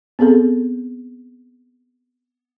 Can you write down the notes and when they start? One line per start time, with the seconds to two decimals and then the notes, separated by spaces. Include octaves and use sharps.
0.19 B3 C4 G#4 A4